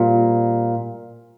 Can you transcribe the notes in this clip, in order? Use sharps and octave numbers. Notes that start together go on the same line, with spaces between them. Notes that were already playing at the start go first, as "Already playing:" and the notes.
Already playing: A#2 G3 C4 F4